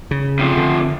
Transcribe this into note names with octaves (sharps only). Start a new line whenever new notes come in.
C#3
C3 F3
D3